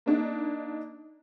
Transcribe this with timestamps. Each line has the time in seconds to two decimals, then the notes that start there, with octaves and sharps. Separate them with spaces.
0.06 A#3 D4 D#4